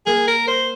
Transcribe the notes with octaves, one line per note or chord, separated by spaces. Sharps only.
A#3 G#4
A#4
C5